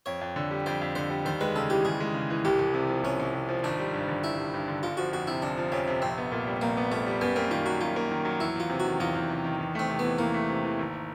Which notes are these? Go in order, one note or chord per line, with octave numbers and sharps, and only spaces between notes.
F2 C#5
F2
D3
G3
F2 C5
F2
D3 C5
G3
D#2 C5
G#3 B4
C#3 A4
E3 G4
D#2 G#4
G#3
C#3
E3
C2 G4
C2
C3
F3
C2 C#4
C2
C3
F3
G#1 D4
G3
G2
D3
G#1 E4
G3
G2
D3
G1 F4
F3 F#4
F2 F#4
C3 E4
G1 D4
F3
F2 C#4
C3
A#1 C4
B3
A#2
G3
A#1 A#3
B3
A#2 A3
G3
F#2 B3
A#3 C4
D#3 F4
F#3 F#4
F#2 F4
A#3
D#3
F#3
E2 E4
E2 F4
C3
F#4
D#3
E2 F4
E2
C3
D#3
E2
A3 C4
C3
E3 B3
E2 A#3
A3
C3
E3
G#1